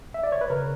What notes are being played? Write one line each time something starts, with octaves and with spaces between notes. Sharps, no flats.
E5
D5
C#5
B4
C#3 A#4